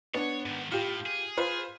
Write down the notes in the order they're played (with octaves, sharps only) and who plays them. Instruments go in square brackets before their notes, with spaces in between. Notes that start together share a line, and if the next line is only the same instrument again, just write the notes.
[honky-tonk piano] B3 D4 [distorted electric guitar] C#5
[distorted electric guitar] G#2 D#3
[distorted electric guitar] A2 [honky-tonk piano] F4 G4
[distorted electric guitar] G#4
[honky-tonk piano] F4 B4 C5